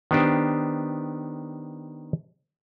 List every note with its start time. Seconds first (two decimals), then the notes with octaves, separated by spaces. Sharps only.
0.11 D#3 B3 D4 G4 C5